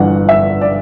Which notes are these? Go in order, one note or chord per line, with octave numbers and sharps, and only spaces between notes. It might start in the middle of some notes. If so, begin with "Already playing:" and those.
Already playing: G1 G2 E3 F#5
E5
D5